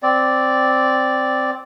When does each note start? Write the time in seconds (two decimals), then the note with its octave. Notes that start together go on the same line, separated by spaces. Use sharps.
0.03 C4 D5